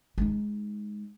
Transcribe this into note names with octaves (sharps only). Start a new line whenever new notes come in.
G#3 D#4